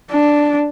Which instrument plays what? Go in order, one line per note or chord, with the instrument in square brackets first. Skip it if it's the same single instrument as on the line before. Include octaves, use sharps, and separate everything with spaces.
[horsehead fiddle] D4